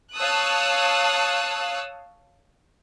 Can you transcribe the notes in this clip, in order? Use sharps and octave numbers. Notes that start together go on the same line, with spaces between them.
C#5 F5 A5 D#6 E6 F#6